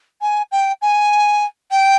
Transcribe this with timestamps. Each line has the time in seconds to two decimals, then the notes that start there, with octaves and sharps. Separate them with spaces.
0.21 G#5
0.52 G5
0.82 G#5
1.71 G5